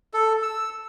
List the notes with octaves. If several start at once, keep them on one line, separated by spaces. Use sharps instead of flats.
A4
E6